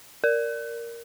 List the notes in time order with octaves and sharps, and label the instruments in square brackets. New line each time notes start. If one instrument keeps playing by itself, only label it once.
[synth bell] A#4